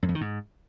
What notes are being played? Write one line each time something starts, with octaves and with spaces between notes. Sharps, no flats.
F#2
F2
D#3
G#2